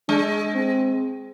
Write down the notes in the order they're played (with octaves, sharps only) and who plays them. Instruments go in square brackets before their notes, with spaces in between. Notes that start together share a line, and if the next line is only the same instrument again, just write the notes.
[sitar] G#3 [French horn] D4
[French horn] C4